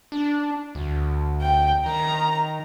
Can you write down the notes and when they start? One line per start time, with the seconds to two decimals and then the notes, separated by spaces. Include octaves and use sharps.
0.12 D4
0.75 D2
1.41 G5
1.86 D#3 A#5